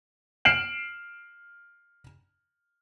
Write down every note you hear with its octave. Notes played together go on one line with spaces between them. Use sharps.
F6 C7 D7 E7 F#7